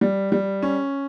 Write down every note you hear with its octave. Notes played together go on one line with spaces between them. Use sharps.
G3
G3
C#4